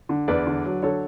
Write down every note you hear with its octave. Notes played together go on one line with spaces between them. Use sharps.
D3
E2 B4 D5
D3
F#3
D3 A4 C#5